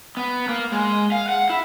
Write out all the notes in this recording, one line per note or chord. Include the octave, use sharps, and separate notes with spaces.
B3
A#3
G#3
F5
F#5
E4